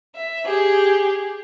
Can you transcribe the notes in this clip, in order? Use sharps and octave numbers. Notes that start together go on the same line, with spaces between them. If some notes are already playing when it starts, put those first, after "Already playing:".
E5
G4 G#4